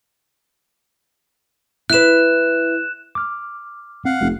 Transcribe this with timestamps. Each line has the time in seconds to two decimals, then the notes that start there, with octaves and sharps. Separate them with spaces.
1.90 E4 B4 F#6 E7
3.15 D6 F6
4.05 C4 F5 F#5
4.20 F1